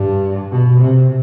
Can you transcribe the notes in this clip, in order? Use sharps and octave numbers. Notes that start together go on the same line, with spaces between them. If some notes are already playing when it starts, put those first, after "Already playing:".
Already playing: G2
B2
C3